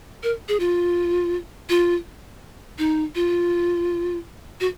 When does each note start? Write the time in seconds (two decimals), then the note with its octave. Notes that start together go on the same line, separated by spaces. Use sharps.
0.23 A#4
0.48 G#4
0.60 F4
1.69 F4
2.78 D#4
3.15 F4
4.60 F#4